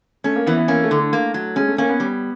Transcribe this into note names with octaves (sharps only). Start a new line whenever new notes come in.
A3 C#4
A#3
E3 B3
B3
A#3 C#4
A3
D3
A3
A#3
F#3
G#3 C#4
A3
A#3 C#4
B3
G3